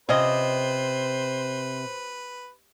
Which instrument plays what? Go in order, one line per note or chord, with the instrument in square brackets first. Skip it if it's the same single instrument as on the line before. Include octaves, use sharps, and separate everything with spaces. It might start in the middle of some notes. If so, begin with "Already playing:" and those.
[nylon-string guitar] C3 [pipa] F3 C#4 D#5 [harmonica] B4 [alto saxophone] C5